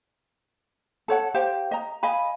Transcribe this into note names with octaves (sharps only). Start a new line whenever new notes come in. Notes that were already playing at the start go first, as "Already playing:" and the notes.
A4 C#5 F#5
G4 C5 F5 G5
D#5 A#5
D#5 F5 G#5 B5